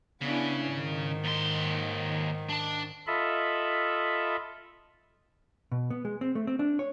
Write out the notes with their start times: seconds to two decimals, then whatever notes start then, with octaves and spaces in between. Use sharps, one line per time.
0.22 C#3 B3 D4 E4
0.71 G#2 D#3
1.24 D#2 C6
2.49 D4 A5
3.07 F4 A4 D#5 E5 B5
5.72 B2
5.90 B3
6.05 G#3
6.21 C4
6.35 A3
6.47 C4
6.59 D4
6.79 C#5